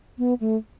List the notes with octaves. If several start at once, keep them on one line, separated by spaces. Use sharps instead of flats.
B3
A3